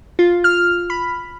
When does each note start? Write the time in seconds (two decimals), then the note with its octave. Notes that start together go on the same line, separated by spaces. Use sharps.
0.19 F4
0.44 F6
0.90 B5